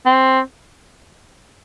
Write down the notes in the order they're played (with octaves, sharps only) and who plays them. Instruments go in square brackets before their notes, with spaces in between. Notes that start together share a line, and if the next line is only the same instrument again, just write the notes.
[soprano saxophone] C4